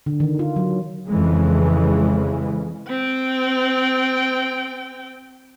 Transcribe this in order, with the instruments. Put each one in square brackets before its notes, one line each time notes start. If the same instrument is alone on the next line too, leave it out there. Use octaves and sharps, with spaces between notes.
[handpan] D3
D#3
F4
F#3
[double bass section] F2 C#3 E3 G#3
[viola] C4 G5